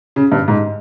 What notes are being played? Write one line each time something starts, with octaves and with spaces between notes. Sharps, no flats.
C#3
G2
G#2